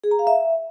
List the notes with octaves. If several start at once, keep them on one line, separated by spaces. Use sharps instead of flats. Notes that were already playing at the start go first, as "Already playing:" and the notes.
G#4
A#5
F5
E5